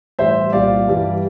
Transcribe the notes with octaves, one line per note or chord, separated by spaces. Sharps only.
A2 E3 G3 C5 E5
C2 A#2 G3 D5 F5
G2 E3 G3